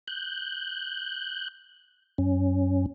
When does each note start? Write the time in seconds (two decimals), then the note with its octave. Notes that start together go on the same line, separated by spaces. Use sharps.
0.08 F#6 G6
2.18 F#2 C#4